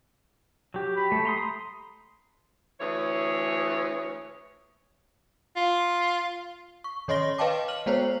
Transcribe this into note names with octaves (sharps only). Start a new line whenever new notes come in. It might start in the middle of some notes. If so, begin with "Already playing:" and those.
F#3 G4
B5
A3
A#5 C6 D#6
D2 E3 G#4 C#5
F4
C#6
D#3 C#5 D#5 C6 A#6 G7
B4 D#5 F5 G5 A5 D6
F6 F#7
G#3 B3 C5 C#5